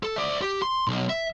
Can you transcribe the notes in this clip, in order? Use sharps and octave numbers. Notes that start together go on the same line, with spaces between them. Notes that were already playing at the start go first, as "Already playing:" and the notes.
A4
D5 E5
G4
C6
B1
E5